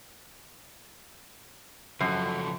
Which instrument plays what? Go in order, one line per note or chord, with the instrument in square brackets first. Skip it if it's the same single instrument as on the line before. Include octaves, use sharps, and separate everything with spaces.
[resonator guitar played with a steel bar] F#2 [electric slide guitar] C#3 F3 A4